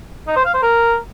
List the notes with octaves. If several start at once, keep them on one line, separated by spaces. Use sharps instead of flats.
D#4
C5
F5
C5
A#4